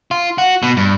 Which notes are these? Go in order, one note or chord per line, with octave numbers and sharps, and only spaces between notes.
F4
F#4
B2
G2